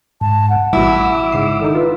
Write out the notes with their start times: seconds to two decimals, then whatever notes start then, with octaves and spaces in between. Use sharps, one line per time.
0.21 G#2 A5
0.50 F#5
0.73 A1 B2 G3 E4 D6 E6
1.32 G#2 C#3 C7
1.60 D#3 D4 D#4 A4
1.75 F4 B4